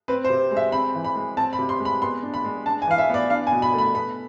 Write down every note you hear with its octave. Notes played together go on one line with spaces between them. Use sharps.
C4 B4
C5
C3
G#3
E5
C4 B5
E3
B5
G#3
C4 A5
B5
C3
C6
G#3
B5
B3 C6
D4
B5
G#3
D4 A5
G#5
E3 F5
E5
B3 D5
D4 F5
G#5
B2
B5
A3 B5
B3 B5